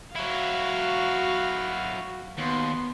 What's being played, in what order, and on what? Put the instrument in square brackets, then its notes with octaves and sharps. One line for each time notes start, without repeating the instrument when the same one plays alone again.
[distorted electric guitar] F#3 E4 [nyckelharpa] F#4 F5
[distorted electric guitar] D#2 [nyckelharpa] B3 C6